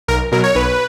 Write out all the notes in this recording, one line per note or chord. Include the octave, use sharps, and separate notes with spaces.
B1 A#4
B2 F#3 A#4
C#5
B1 B4